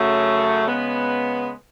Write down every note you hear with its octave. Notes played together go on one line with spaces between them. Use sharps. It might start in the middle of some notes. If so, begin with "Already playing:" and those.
Already playing: F#2 C#3 F#3 A3
C#3 G#3 B3